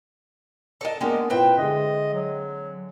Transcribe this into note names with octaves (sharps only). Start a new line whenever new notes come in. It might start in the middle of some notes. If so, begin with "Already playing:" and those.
A4 A#4 D5 D#5 A5
G#3 A#3 B3 D4 D#4 G4 A#4
A#2 C4 E4 B4 C#5 E5 G5
D3 G#3 D#5
F#3